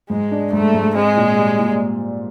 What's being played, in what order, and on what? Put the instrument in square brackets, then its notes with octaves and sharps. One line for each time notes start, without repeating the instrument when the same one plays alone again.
[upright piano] G#2 [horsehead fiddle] G#3
[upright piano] D4
[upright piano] G#2 [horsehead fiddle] A3
[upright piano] G#2
[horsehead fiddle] G#3 [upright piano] C4
[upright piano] A#2
G3
A#2